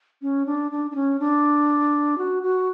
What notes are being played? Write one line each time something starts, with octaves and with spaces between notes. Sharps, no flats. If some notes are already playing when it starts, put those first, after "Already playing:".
C#4
D4
D4
D4
C#4
D4
F#4
F#4